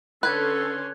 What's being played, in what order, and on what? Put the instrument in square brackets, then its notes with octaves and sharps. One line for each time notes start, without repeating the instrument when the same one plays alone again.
[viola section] D3 C#4 C6 [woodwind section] A4 [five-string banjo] B4 [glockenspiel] F#6 G#6